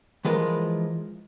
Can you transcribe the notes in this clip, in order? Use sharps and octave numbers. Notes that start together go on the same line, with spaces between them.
E3 F3 G#3 F4 A#4 B4